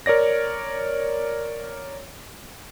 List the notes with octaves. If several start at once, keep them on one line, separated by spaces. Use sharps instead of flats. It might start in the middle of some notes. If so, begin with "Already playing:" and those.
A#4 C#5 D5 A#6